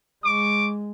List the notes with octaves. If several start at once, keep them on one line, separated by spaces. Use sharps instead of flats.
G#3 C#6 D6